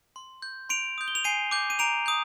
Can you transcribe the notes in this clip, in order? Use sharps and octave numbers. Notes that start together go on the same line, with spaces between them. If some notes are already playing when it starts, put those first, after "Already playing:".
C6
G6
C6 D7 F7
D#6 G6
G7
F7
G#5 C7 D#7
D6 G6
D#7
A#5 D7 F7
D#6 G6